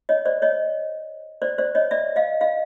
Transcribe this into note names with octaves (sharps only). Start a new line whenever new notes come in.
C#5 D#5
C5 D5
C#5 D#5
C5 D5
C5 D5
C#5 D#5
D5 E5
D#5 F5
D#5 F5